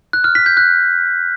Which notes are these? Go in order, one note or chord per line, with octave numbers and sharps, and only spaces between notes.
F#6
F6
B6
G6
F#6